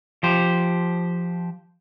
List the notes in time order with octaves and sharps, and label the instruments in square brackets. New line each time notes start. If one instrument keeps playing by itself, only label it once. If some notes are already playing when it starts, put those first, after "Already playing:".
[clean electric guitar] F3 G4 C5